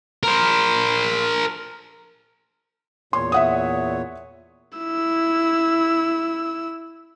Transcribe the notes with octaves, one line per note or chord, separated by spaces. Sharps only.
A#4 C5
E2 A#2 C#5 C6
E5 F#5 D#6
E4 E6